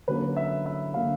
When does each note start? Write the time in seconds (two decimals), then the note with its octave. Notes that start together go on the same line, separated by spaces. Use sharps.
0.08 D3 F#3 A#3 C#4 B4
0.36 E5
0.66 E5
0.94 D3 F#3 A#3 C#4 F5